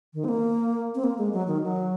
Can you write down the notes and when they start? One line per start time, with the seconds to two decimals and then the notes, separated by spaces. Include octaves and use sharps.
0.14 D#3
0.24 C4
0.29 A#3
0.95 C4
1.04 A#3
1.18 G#3
1.33 F#3
1.47 D#3
1.64 F#3